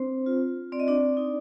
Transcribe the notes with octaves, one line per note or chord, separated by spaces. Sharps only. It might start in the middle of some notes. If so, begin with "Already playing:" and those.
Already playing: C4 D4 C5
F4
C4 D5
D#5
D4 D5
D#4